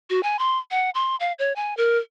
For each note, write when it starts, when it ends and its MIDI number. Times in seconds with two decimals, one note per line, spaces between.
0.10 0.21 66
0.23 0.39 80
0.39 0.58 84
0.71 0.90 78
0.95 1.16 84
1.20 1.33 77
1.39 1.53 73
1.56 1.76 80
1.77 1.98 70